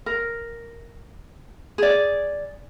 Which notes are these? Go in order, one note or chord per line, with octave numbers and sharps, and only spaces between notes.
A#4
G#4 D5